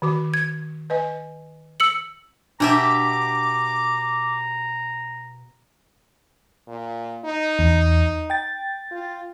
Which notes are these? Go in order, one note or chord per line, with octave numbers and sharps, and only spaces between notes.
D#3 F#4 D6
G#6
B4 D#5 G#5
E6 C#7 F#7
B2 D4 G4 E5 A#5 D6
A#2
D#4
E2
G5 A6
F4